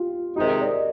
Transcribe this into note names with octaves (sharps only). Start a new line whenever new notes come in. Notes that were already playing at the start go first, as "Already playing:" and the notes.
Already playing: F4 G4
C3 D#3 G#3 D#4 G4
A#4
D5
D#5